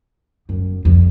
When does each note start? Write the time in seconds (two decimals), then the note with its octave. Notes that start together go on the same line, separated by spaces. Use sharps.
0.49 F#2
0.85 F2